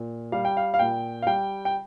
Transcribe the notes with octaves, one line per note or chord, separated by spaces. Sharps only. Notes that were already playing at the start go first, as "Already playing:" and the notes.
Already playing: A#2
G3 F5
G5
F5
F5
A#2 G5
F5
G3 G5
G5